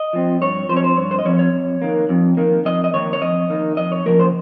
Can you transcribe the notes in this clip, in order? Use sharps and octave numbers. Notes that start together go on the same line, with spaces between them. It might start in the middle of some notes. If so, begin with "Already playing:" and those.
Already playing: D#5
F3 C4
G2 C#5
F3 C4 C5 C#5
C5
G2 C#5
C5
D#5
F3 C4 C#5
C#5
F2
D#3 A#3
F2
D#3 A#3
F2 D#5
D#5
D#3 A#3 C#5
C#5
F2 D#5
D#3 A#3
F2 D#5
C#5
C#3 F3 A#3 A#4
C5